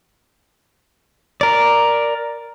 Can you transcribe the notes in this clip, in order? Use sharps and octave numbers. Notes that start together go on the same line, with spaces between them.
A#4 D5